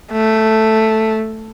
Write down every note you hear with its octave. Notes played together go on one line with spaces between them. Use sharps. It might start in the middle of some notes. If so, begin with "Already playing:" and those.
A3